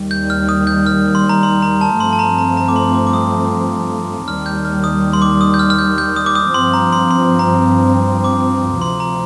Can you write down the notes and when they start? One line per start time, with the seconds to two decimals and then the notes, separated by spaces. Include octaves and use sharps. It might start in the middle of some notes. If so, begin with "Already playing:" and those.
Already playing: D#2 D#3 G3
0.11 G6
0.30 F6
0.49 D#6
0.67 G6
0.86 F6
1.15 C6
1.29 A#5
1.43 C6
1.62 A#5
1.81 A5
2.00 G2 F3 A3 C4 C6
2.13 A5
2.19 A#5
2.38 A#5
2.57 A#5
2.68 D6
2.76 C6
2.95 D6
3.07 D6
3.13 D#6
4.27 D#2 D#3 G3 F6
4.46 G6
4.65 F6
4.84 D#6
5.13 C6
5.22 D6
5.41 D#6
5.54 G6
5.59 F6
5.70 F6
5.79 G6
5.98 G6
6.16 D#6
6.26 D6
6.36 D#6
6.54 G2 F3 C4 C6
6.74 A#5
6.93 C6
7.11 C6
7.39 A#5
8.24 D6
8.81 D2 C3 F3 C4 C6
9.00 A#5